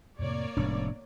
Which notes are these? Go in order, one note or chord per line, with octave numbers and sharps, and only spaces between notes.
F2 A2 C3 A#3 C#5 D5
F1 A2 G#3 B3 D4